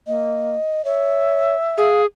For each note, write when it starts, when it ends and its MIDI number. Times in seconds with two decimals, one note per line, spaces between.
0.07 0.56 58
0.07 0.84 75
0.85 1.55 73
0.85 1.89 76
1.78 2.06 68
1.78 2.02 77